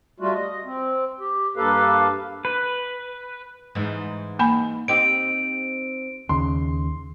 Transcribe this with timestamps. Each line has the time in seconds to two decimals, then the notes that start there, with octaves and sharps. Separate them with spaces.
0.20 G3 A3 F4 F#4
0.34 D#5
0.65 C4
1.20 G4
1.57 G2 A#3 G4 A4 B4 F5
2.45 B4
3.75 G#2 E3
4.39 A#3 G#5 B5
4.88 C4 D#4 G4 D7
6.29 D#2 C#3 C6